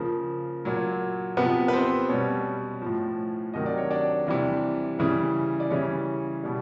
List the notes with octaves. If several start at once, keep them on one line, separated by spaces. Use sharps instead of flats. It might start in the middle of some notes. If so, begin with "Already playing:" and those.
Already playing: C#3 F3 A#3 A#4
A#2 F#3
C3 F3 B3 B4
B4
C4 C5
B2 G3 C#4 C#5
A2 F3
C3 D#3 F#3 D#5
D5
C#5
D4 D5
C3 E3 G3
C#3 E3 G3
D5
C#3 E3 G3 C#4 C#5
B2 G3